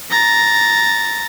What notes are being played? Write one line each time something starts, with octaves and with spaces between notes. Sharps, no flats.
A#5 A6